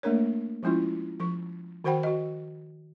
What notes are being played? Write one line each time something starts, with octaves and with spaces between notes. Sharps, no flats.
A3 A#3 D4 A#4 C#5
F3 G#3 C#4 E4 F4
F3 C#6
D#3 F#4 C5 F#5 G5 B5
F#4 D#5